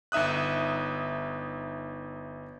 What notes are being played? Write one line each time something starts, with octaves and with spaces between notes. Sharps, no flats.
G1 D#4 E5 D#6 F#6